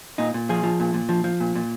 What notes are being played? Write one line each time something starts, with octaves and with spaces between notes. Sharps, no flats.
A#2 D#4
A#2
F3 G#4
F3
A#2
A#2
F3
F3
A#2
A#2